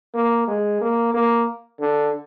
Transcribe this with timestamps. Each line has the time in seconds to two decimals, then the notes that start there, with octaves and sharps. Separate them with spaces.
0.14 A#3
0.48 G#3
0.81 A#3
1.14 A#3
1.80 D3